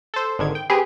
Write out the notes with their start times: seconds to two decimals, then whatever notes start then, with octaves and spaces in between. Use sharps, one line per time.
0.14 A4 C5
0.39 G#1 D3 D#3 G#6
0.55 G5
0.70 C4 G4 G#4 B4